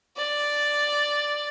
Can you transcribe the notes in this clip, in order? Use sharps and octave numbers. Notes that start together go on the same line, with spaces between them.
D5